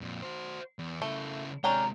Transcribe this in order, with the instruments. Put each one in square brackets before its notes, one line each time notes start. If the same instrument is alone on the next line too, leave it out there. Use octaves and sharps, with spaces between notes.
[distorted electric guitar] F2 A#2
F#4 C5
E2
[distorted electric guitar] C#3 E4 [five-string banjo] A3
[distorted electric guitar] C3 G#3 [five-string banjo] C#4 D4 G5 [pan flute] A#5